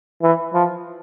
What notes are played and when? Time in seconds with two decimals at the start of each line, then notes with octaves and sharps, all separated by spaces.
0.23 E3
0.54 F3